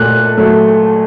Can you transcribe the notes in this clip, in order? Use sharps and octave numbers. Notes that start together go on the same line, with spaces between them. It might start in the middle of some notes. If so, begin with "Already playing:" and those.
Already playing: A#2 A3 F#6
F#3 A3